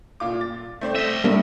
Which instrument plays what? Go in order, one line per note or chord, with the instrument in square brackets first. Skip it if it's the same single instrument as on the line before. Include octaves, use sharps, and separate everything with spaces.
[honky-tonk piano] A#2 F4 D6
A6
A3 C4 D5
[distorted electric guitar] D#5 E5
[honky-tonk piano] G2 D4 [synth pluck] G3 A#3